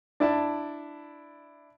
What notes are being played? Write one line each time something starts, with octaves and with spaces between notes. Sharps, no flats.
D4 E4 A5